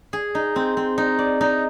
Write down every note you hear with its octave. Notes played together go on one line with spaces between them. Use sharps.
G#4
D#4
C4
C4
D#4
D5
D#4